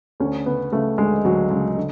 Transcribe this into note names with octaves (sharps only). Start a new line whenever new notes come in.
D2 C#4
C#3 B3
C#3 A3
D2 G#3
D2 F#3
C#3 G#3
D3